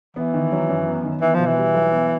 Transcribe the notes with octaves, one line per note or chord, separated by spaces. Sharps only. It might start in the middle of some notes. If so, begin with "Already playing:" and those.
E3 B3
D#3
F#3
F#2
B3
D#3
E3 B3
B2 F3
E3
G3
B1
B3